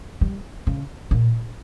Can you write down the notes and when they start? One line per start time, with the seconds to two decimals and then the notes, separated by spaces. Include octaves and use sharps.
0.21 G3
0.67 C#3
1.11 A#2